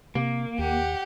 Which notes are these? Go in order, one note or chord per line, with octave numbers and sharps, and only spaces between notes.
C3 A#3
D#2 G4 F#5